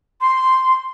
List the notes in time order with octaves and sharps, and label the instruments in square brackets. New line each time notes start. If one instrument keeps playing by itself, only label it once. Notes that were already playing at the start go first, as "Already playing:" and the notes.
[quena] C6